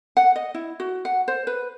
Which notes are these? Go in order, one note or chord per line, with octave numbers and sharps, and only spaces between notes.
F#5
D#5
E4
F#4
F#5
C5
B4